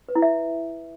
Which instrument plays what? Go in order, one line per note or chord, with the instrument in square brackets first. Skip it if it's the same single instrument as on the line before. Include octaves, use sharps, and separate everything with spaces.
[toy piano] B4
E4
E5